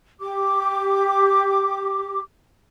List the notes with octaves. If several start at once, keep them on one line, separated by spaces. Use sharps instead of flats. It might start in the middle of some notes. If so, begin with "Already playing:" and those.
G4 D6